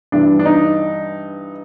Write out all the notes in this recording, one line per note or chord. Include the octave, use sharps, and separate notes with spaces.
G2 E3 G3 D4
D4
D#4